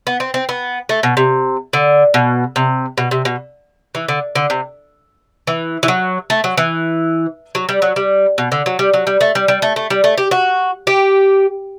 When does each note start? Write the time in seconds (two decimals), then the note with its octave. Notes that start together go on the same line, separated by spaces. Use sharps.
0.07 B3
0.20 C4
0.34 C4
0.49 B3
0.89 A3
1.03 B2
1.17 C3
1.73 D3
2.14 B2
2.56 C3
2.98 B2
3.11 C3
3.25 B2
3.95 E3
4.08 D3
4.35 D3
4.50 C3
5.47 E3
5.83 E3
5.88 F#3
6.30 A3
6.44 F#3
6.57 E3
7.55 F#3
7.69 G3
7.82 F#3
7.96 G3
8.38 B2
8.52 D3
8.66 F#3
8.79 G3
8.94 F#3
9.07 G3
9.21 A3
9.35 G3
9.48 G3
9.62 A3
9.76 A3
9.90 G3
10.04 A3
10.18 G4
10.31 F#4
10.87 G4